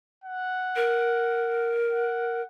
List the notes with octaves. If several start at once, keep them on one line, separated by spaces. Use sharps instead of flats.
F#5
A#4
F#5